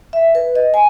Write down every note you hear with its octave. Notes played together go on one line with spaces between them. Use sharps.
E5
B4
D#5
G#5